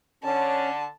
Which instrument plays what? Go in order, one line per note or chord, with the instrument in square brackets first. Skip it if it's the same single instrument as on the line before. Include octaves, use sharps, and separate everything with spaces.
[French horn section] D3 [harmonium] C#4 [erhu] A5